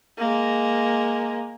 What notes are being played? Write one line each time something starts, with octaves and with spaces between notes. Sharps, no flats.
G#3 A#3